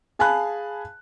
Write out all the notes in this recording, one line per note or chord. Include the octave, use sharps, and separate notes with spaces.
G#4 F5 G#5 A5 B5 F#6